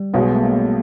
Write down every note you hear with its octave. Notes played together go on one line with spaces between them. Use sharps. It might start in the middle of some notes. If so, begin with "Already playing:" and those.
Already playing: G3
B1 B2 G#3 B3
A3
A#3